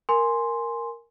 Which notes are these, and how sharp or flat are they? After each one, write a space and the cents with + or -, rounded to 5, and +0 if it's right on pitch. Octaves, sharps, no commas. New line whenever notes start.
A#4 +0 G#5 +0 C6 +0